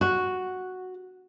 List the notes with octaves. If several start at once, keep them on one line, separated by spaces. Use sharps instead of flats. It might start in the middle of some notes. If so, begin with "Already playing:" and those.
F#4